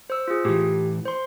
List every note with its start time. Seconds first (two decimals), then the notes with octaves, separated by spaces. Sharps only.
0.10 C5 E6
0.28 F4 G#4
0.45 A2 E3 G4
1.05 C5 C6